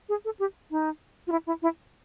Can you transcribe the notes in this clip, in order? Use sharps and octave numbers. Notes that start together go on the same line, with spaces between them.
G#4
A4
G4
D#4
F4
E4
E4
E4